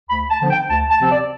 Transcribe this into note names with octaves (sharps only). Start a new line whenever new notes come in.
D2 B5
A5
D3 F3 B3 D4
G5
D2 A5
A5
C3 F3 C4
D5